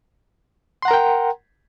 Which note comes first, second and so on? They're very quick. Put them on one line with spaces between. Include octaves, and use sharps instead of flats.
C6 F#5 A#5 A#4 G5